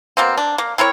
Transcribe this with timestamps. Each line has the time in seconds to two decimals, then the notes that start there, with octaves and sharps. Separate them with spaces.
0.17 B2 A#3 C4
0.38 D4
0.58 A#3
0.78 C4 E4 A#4 C#5